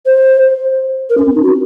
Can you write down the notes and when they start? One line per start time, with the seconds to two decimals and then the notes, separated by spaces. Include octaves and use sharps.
0.06 C5
1.10 A#4
1.18 C#4
1.26 C4
1.35 D#4
1.43 F#4